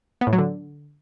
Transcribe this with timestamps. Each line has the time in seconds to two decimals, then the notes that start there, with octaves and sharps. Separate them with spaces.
0.21 B3
0.27 A2
0.33 F#3
0.38 D3